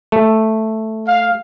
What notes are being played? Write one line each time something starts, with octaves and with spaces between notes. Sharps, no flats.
A3
F5